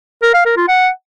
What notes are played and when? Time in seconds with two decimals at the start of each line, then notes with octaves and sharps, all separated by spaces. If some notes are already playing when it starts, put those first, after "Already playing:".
0.22 A#4
0.34 F5
0.45 A#4
0.56 F4
0.68 F#5